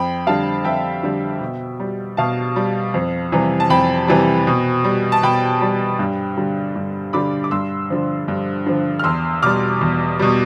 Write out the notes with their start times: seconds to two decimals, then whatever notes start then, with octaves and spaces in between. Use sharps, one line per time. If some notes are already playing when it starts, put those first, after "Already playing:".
Already playing: F2 G5 B5
0.27 D3 G3 F5 A5
0.65 F2 E5 G5
1.03 D3 G3
1.41 B2
1.80 G3
2.17 B2 F5 A5
2.56 G3
2.94 F2
3.32 C3 E3 G3
3.60 A5
3.70 F2 G5 B5
4.08 C3 E3 G3
4.47 B2
4.84 G3
5.12 A5
5.23 B2 G5 B5
5.62 G3
5.99 G2
6.37 D3 G3
6.76 G2
7.13 D3 G3 B5 D6
7.44 D6
7.51 G2 C6 E6
7.90 D3 F3
8.28 G2
8.66 D3 F3
8.99 F6
9.04 E2 C6 E6
9.43 B2 G3 D6 F6
9.81 E2
10.19 B2 G3